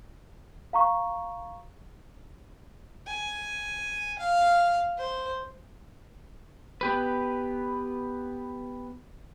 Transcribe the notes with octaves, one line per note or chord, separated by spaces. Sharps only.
F5 A#5 C#6
G#5
F5
C5
B3 G4 B4